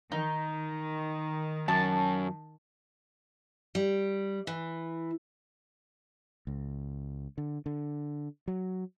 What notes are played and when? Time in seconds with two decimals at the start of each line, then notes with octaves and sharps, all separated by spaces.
0.12 D#3 D#4
1.68 F#2 A5
3.75 G3
4.47 E3
6.47 C#2
7.38 D3
7.66 D3
8.48 F#3